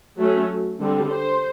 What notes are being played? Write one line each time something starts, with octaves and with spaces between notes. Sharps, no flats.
F#3 A3 C#4
D3 G3 C4
C5